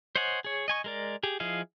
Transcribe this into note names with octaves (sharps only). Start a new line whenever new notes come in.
C5 C#5 D#5 F#5 G#5
G#4 C#5
D#5 G#5 C#6
G#3 A#4 D5
G4 G#4
F3 E4 G#4 D#5 F5